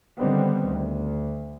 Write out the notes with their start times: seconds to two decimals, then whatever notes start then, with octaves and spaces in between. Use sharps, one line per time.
0.18 D3 D#3 G3 B3 C4
0.68 D2